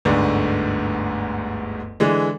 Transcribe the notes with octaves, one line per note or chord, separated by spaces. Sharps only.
G1 D2 G#2 D3
D3 E3 G#3